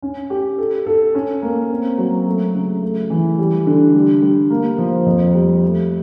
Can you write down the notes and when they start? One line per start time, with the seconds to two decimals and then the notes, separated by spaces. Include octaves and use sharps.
0.02 C#4
0.30 G4
0.58 A4
0.86 A4
1.15 C#4
1.42 A#3
1.71 C4
1.98 F#3
2.26 A3
2.55 C#3
2.82 A3
3.10 E3
3.38 G3
3.66 D3
3.94 G3
4.22 G3
4.50 A#3
4.78 F3
5.06 F2
5.35 G3
5.63 A3